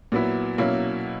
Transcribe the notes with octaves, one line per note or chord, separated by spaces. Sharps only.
A#2 F#3 B3 E4
B2 F#3 A#3 C#4 E4